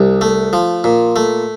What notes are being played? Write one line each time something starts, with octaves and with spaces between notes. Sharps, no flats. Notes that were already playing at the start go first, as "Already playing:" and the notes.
Already playing: C2
A3
F3
A#2
A3